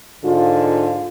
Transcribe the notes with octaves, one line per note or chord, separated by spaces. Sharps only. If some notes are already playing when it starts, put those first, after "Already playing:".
G#2 D3 F4